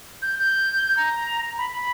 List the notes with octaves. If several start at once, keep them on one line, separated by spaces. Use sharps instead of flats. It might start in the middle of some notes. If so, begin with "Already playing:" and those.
G6
G6
A#5
B5